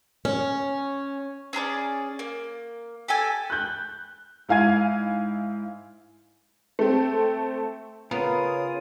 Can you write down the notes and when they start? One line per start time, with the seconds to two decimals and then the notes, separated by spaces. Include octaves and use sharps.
0.25 C#4
1.53 C#4 G#4 A#4 D5
2.19 A#3
3.08 G4 A4 G#5
3.50 F#6 G6
4.48 G#2 E4 F5 G#5 G#6 D#7
6.79 A3 C4
8.11 C#3 B3 F4 G#4 A#4 C#5 D#6